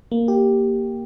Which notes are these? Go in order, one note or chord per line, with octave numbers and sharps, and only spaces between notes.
A#3
G4